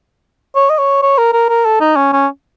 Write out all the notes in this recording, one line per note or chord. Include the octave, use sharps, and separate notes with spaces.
C#5
D#5
C#5
C#5
A#4
A#4
A#4
A4
D#4
C#4
C#4